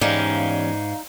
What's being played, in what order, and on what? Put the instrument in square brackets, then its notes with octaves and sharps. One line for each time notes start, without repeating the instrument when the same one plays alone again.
[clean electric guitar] E2 C#4 G4 [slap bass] G#2 [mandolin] D#4 [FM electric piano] D5 F5